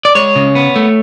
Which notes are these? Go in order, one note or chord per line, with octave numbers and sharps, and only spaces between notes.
D5
G#3 C#5
C#3
B3
A3